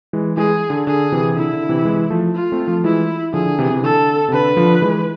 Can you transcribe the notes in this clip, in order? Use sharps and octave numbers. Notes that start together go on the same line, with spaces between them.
E3 G#3
E3 G#3 G#4
D3
D3 G#4
C3 E3
D3 E4
D3
C3 E3
E3 G#3
F3 A3
F4
A3 C4
F3 A3
E3 G#3 E4
D3 F3 G#4
D3
C3 E3
C3 E3
D3 A4
C3
D3 B4
D3 F3
E3 G#3